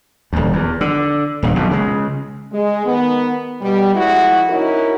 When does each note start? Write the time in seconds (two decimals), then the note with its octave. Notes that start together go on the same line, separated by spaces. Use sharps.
0.33 D#1 D2
0.53 E2
0.81 D3
1.43 D#1 A#1 A#2
1.56 B1 F2 B2
1.71 C#3 G#3
2.52 G#3
2.85 D#3 B3
3.62 B2 G3
3.94 F3 G#3 E4 F#4
4.49 C#4 D#4 E4 F#4 A#4